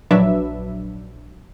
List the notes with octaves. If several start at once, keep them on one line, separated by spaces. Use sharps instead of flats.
A#1 F#3 D4 B4 E5